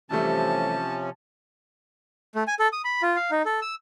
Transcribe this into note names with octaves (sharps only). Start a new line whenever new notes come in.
C3 E3 F3 G3 A3 C#4 A5
A3
G#5
A4
D#6
B5
F4
F5
D#4
A4
E6